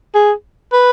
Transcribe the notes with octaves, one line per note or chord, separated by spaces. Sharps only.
G#4
B4